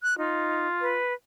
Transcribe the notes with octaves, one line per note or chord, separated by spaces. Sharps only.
F#6
D#4 F4
B4